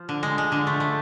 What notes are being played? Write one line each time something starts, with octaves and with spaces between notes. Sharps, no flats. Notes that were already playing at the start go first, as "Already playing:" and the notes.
Already playing: F3
D3
G#3
G#3
D3
A3
A3